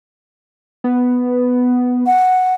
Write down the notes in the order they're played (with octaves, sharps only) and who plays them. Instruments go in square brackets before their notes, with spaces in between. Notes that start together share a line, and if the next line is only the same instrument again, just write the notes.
[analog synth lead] B3
[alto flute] F#5